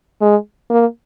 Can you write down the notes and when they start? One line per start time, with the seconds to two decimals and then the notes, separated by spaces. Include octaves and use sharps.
0.21 G#3
0.70 A#3